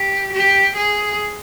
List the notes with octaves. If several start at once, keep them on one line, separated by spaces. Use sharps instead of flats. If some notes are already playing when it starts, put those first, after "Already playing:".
Already playing: G4
G4
G#4